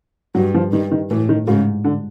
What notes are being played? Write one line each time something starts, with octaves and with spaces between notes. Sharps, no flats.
G2 F#3
F3
G2 D#3
D#3
A2 E3
D#3
G#2 C#3
D3